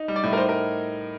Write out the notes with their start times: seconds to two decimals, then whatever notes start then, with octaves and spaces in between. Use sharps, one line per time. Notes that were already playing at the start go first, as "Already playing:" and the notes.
Already playing: D#4
0.08 G3
0.16 D5
0.23 A2
0.33 A#4
0.37 D#4 C5
0.49 A#4